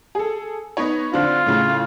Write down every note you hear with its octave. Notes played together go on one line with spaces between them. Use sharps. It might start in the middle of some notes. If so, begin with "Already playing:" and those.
G#4 A4
B3 D#4 C#5
D3 C4 D4 F4
A2 C#3